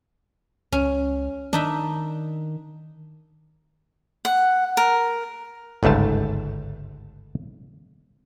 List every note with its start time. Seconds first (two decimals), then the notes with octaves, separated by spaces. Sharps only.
0.72 C#2 C#4
1.53 D#3 D4 D#4 E5
4.25 F#5
4.77 A#4
5.83 G1 C#2 G#2 A3 A5